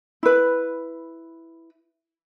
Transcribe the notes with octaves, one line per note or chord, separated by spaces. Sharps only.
E4 B4